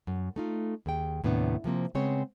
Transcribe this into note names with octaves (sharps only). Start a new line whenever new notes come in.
F#2
A3 D#4 F4
D#2 G#4 G5
D#2 A2 C3 B3 D4
C3 F3 A#3 C4
C#3 G#3 B3 C4 C#5